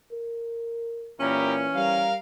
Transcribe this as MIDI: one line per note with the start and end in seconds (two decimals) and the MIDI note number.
0.12 1.14 70
1.20 1.67 46
1.20 2.08 52
1.20 2.08 61
1.20 1.53 64
1.20 1.53 67
1.20 1.53 70
1.75 2.18 55
1.75 2.14 70
1.75 2.14 77